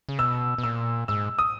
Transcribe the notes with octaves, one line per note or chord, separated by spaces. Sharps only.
C#3
B2 E6
B2
A#2 E6
G#2 E6
D#6